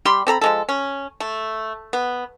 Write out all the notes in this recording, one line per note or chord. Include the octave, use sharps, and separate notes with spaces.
G3 G4 B5 C6
C4 A4 A#5 B5
F3 G#3 A4
C#4
A3
B3